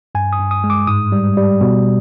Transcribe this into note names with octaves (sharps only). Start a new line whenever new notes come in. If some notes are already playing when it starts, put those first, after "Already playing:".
G2 G#5
D#6
G2
D#6
G#3
D6
G#2 D#6
G3
G3
B2